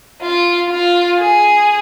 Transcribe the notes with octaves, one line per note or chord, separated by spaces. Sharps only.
F4
F4
G#4